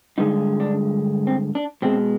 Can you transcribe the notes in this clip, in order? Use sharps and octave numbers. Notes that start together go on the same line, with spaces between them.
G2 D3 G#3 D#4
D4
C4
D4
B2 G#3 C4